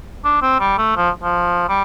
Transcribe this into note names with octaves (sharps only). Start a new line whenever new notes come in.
D4
C4
G3
A3
F3
F3
G3